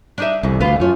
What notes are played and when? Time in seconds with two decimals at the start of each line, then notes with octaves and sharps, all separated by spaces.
0.18 D4 D#4 E5
0.43 C2 F2 E3
0.61 D2 F4 B4 F5
0.80 F#2 A3 C#4 F4